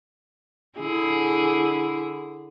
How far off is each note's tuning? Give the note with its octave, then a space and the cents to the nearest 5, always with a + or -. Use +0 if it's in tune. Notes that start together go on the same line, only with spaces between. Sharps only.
D3 +0 E4 +0 G#4 +10